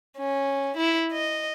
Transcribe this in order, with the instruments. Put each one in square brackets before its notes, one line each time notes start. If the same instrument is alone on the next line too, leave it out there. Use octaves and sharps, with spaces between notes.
[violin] C#4
E4
D#5